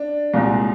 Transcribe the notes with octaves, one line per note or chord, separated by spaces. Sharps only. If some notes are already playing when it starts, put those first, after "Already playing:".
Already playing: D4
C2 A#2 G#3